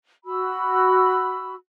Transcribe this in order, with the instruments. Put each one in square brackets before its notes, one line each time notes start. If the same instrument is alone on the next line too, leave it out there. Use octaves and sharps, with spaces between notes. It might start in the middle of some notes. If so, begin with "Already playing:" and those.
[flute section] F#4 B5 E6